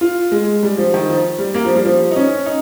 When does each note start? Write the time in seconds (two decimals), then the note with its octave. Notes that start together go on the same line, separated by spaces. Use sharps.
0.01 F4
0.32 G#3
0.63 G3
0.77 F3
0.94 D#3
1.09 F3
1.39 G3
1.54 A#3
1.65 F3
1.75 G3
1.85 F3
2.11 D#4
2.16 C#4
2.46 D#4